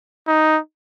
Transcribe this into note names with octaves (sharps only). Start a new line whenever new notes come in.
D#4